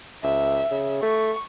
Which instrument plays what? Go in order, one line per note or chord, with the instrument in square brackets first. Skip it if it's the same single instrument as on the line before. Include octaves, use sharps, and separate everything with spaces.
[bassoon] C#2 [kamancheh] E5
[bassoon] C#3
[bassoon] A3 [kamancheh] C#6